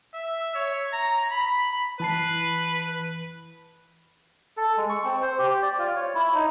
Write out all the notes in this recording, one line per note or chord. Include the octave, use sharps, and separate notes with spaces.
E5
C#5
A#5
B5
E3 B4 A5 C7
A4
G#3
C#6
C4
C5
G4
D5
F4
C#5
E4
D#4